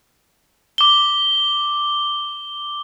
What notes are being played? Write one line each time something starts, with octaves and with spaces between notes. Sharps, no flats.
D6 G7